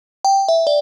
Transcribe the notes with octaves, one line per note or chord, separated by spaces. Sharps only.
G5
E5
D5